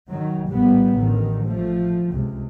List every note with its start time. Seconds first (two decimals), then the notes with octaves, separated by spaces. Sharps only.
0.10 D#3 F#3
0.49 A#1 A2 G3 B3
0.96 A1 D3 D#3
1.45 F3 A3
2.13 C#2 C3